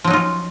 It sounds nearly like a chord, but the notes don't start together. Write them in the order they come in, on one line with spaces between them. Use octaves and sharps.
F3 F#3 D#4 F4 C#4